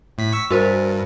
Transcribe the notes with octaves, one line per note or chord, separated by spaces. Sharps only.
A2 B6
C#6 E6 B6
G2 F#4 A#4 C5